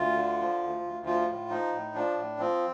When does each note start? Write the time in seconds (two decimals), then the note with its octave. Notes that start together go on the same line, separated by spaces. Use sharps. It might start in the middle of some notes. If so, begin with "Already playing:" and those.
Already playing: D2 F4
0.16 D3
0.39 F3
0.61 D2
0.83 D2
1.05 F3 F4
1.28 A2
1.50 F3 D#4
1.73 A2
1.95 F3 D4
2.17 A2
2.39 F3 C4